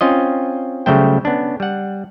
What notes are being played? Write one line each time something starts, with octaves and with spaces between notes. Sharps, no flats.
C4 C#4 F4 D#5
C#3 F#3 G3 A3 C5 G5
B3 C#4 D4
G3 F#5